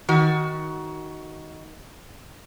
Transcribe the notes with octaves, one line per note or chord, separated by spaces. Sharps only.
D#3 F#4